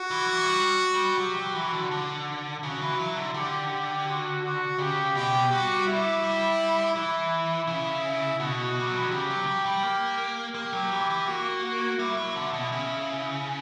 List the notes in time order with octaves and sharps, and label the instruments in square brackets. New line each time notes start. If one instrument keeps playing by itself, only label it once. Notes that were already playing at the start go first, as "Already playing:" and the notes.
Already playing: [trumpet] F#4
[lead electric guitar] E3
E3
G3
G3
[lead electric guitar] F#3 [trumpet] G4
[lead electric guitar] F#3
[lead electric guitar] E3 [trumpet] F#4
[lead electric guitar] D3
D3
[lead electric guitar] C#3 [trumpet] F#4
[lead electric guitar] E3
[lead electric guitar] F#3 [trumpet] E4
[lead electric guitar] D3
[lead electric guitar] D3 [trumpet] G4
[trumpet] G4
F#4
F#4
[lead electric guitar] C#3 [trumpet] G4
[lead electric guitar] B2 [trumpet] G4
[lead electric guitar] G3 [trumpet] F#4
[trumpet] E4
[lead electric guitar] G3
[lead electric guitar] E3 [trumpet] E4
[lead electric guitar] C#3
[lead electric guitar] B2 [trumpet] F#4
[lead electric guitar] G3
F#3
E3
D3
[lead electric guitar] C#3 [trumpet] G4
[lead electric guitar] F#3
F#3
G3
A#3
[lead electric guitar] A#3 [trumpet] G4
[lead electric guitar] F#3
E3
E3
[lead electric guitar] A#3 [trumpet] F#4
[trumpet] F#4
[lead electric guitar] G3 [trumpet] E4
[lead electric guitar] F#3
D3
B2
C#3